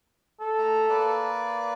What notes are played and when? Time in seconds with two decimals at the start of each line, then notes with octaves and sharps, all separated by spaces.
0.40 A4
0.58 A3 A#5
0.90 A#3 B4 D5